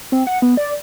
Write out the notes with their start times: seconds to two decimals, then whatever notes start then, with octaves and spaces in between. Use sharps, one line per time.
0.12 C4
0.27 F#5
0.42 B3
0.57 D5